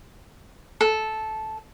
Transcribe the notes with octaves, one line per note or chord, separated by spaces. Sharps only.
A4